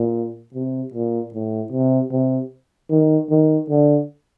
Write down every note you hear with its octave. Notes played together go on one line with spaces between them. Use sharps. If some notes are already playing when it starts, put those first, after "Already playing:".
Already playing: A#2
C3
A#2
A2
C3
C3
D#3
D#3
D3